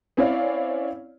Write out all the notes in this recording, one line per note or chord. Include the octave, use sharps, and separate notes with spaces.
C4 C#4 E4 C#5 D5 F5